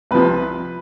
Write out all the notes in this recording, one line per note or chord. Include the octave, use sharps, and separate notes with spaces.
C2 C3 F3 B4